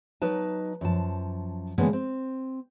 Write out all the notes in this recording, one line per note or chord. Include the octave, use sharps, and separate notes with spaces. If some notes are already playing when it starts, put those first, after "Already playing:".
F#3 D#4 B4 A5
F#2 F3 A5
D3 E3 G#3 A#3 B3 C#4
C4